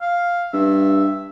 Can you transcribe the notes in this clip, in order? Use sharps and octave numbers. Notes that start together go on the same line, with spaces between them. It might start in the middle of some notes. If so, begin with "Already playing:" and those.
F5
G2 E5